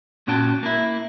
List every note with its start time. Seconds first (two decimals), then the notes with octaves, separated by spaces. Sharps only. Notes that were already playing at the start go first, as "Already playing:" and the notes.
0.27 A#2 C#4 F#4 G5 A5
0.63 A#3 E4